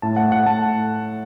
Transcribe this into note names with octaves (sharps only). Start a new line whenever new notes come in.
A2 A5
A3 F#5
A2 F#5
A3 A5